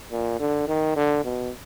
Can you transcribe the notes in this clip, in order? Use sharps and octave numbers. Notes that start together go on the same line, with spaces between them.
A#2
D3
D#3
D3
B2